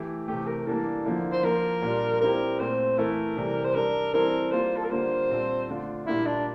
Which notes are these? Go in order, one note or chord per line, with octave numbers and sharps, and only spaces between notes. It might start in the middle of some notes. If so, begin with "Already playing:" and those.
Already playing: E3 A3 E4 G4
C3 E3 A3 G4
A#4
E3 G3 A#3 D4 A4
D3 F3 A#3 E4
C5
F3 A#3 F4 A#4
A#2 G3 D4 F4
G3 C4 E4 G4 A#4
A#2 A3 C4 C5
E3 A3 E4 A4 A#4
C3 E3 G3
C5
G3 D4 A4 A#4
E3 G3 C4 E4 A4 A#4
G3 A#3 F4 C5
A4
A#4
D3 G3 A#3 F4 C5
A#2 G3 C4 F4 A4
D3 A3 D4 F4
A#2 G3 A#3 D4 E4 F4
D4